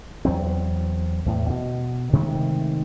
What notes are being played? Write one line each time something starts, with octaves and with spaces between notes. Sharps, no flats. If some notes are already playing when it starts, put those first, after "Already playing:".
E2 F#3 C4
E2 A2
B2
C3 D#3 G#3 A3